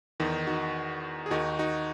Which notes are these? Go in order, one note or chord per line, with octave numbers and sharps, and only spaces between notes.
E2 D#3 D#4
D#4 F#4
G#4
D#2 D#3 D#4 F#4
D#4 F#4